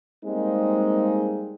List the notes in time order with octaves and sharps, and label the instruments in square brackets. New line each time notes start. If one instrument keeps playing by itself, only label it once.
[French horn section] G3 G#3 A#3 C4 D#4